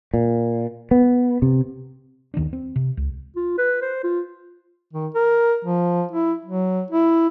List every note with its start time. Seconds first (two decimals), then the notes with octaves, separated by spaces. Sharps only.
0.14 A#2
0.91 B3
1.42 C3
2.34 D#2 D#3 B3 D4
2.53 C4
2.76 C3
2.97 C#2
3.36 F4
3.58 B4
3.82 C5
4.04 F4
4.93 D#3
5.14 A#4
5.64 F3
6.11 E4
6.45 F#3
6.90 E4